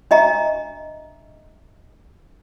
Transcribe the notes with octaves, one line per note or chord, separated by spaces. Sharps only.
D4 D#5 E5 A#5